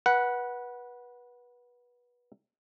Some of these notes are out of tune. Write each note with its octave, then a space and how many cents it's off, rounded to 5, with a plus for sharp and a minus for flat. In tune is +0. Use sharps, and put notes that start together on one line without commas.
B4 -20 F#5 +0